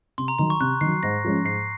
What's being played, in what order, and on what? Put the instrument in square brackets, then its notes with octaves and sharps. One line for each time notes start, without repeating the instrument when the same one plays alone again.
[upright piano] C3 [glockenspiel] C6
[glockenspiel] A#5
[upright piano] D#3 F#3 [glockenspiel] A#5
[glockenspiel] C#6
[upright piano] C3 [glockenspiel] F#6
[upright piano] D#3 [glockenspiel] C7
[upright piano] F#3
[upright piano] G#2 [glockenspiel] A#6
[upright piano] F3 G#3 C#4
[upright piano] G#2 [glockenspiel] C7